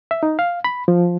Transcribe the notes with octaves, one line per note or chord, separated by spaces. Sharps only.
E5
D#4
F5
B5
F3